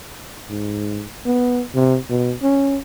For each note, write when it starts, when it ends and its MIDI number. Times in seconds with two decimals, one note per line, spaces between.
0.49 1.05 44
1.25 1.62 59
1.75 1.97 48
2.10 2.34 47
2.43 2.79 61